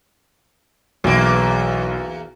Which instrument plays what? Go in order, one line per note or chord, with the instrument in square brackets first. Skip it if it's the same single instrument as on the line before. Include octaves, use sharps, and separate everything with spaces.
[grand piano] B1 [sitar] E2 A#3